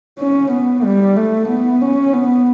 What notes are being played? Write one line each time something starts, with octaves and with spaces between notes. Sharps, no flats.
C#4
B3
G3
A3
B3
C#4
B3